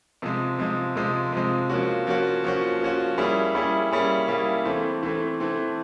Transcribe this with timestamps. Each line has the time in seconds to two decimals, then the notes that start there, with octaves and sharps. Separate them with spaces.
0.22 C3 F3 G#3
0.59 C3 F3 G#3
0.96 C3 F3 G#3
1.32 C3 F3 G#3
1.70 F3 A#3 C#4 F#4
2.07 F3 A#3 C#4 F#4
2.44 F3 A#3 C#4 F#4
2.81 F3 A#3 C#4 F#4
3.18 G3 A#3 C#4 E4 G#4
3.55 G3 A#3 C#4 E4 G#4
3.91 G3 A#3 C#4 E4 G#4
4.28 G3 A#3 C#4 E4 G#4
4.65 E3 A3 C4
5.03 E3 A3 C4
5.40 E3 A3 C4